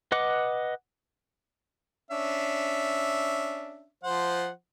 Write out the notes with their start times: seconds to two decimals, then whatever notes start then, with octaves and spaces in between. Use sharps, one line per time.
0.12 B4 D#5 F#5 D6
2.11 C#4 D4 E5
4.04 F3 C5 F#5